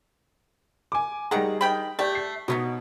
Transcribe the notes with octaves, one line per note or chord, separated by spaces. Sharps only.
G#5 D6
D#3 G3 G#4 F#5 A#5
D#3 G5 B5
A3 G4 D5
C7
B2 F#3 B3 D#4